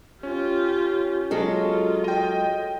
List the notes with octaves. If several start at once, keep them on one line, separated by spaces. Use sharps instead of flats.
C#4 F4 G4
F#3 G#3 F4 A4
D#5 G5